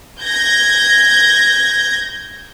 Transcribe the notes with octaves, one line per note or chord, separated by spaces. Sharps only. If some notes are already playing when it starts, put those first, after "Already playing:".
G6 G#6 A#6